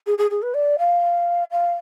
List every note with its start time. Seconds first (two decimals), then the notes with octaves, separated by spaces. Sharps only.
0.06 G#4
0.18 G#4
0.30 G#4
0.42 B4
0.54 D5
0.78 F5
1.51 F5